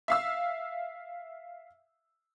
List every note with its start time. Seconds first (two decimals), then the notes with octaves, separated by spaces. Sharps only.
0.08 E5 F5 E6